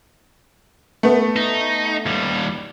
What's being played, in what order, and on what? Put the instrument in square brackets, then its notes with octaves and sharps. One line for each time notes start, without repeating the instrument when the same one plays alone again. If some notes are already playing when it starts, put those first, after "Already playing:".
[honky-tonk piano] A3 B3
[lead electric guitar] D#4
D#2 G3